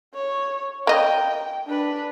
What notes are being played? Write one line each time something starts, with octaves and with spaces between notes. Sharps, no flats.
C#5
A#3 D#5 G5
D4 B4